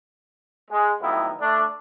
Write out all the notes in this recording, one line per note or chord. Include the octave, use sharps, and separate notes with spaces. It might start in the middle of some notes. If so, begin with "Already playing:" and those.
G#3
F2 A2 D#3 F#3 B3 E4
A3 D4